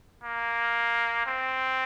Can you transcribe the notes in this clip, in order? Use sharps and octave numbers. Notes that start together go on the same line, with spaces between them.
A#3
C4